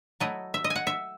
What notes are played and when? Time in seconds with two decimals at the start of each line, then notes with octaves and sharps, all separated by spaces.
0.20 F#3 A3 E4 D#5
0.54 E5
0.64 D#5
0.70 G#5
0.76 F#5
0.87 E5